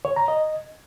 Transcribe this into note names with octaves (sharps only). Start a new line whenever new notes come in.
C#5
A#5
D#5